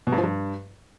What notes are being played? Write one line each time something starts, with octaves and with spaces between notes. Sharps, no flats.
B2
G2
F3
G2